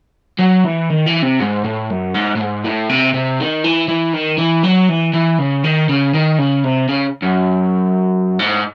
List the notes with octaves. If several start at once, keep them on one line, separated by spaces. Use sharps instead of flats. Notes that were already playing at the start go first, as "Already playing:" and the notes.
F#3
E3
D#3
E3
C3
G#2
A2
F#2
G#2
A2
G#2
A2
C3
C3
D#3
E3
E3
D#3
E3
F#3
E3
E3
C#3
D#3
C#3
D#3
C#3
C3
C#3
F#2
G#2